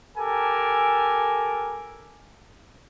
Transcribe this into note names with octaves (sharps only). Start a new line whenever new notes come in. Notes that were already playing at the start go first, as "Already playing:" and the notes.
G4 A4 A#4 G#5 A5